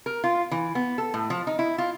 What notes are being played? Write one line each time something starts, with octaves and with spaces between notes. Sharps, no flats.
A#4
F4
E3
B3
A4
A2
F3
D#4
E4
F4